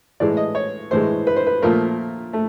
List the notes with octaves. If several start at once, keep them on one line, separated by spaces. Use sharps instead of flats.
A2 E3 G#3 D5
D#5
C#5
A2 E3 G#3 C5
B4
C5
B4
A#2 F3 A3 A#4
A3